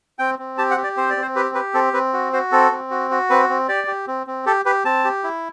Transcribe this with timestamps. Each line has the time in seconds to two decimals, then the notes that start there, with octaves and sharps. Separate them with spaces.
0.19 C4 G5
0.39 C4
0.58 G4 A5
0.71 F#5
0.77 G4
0.84 D5
0.97 C4 C5
1.10 D5
1.17 C4
1.22 C5
1.35 G4 B4
1.55 G4 B4
1.74 C4 A4
1.93 C4 B4
2.13 F#4
2.33 F#4 C5
2.52 C4 A4
2.71 C4
2.91 F#4
3.11 F#4
3.30 C4 B4
3.49 C4
3.68 G4 D5
3.87 G4
4.07 C4
4.27 C4
4.46 G4 A4
4.65 G4 B4
4.85 C4 A5
5.04 G4
5.24 E4